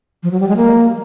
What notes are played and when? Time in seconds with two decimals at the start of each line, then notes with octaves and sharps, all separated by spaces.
0.23 F3
0.31 F#3
0.40 G3
0.49 G#3
0.57 A#3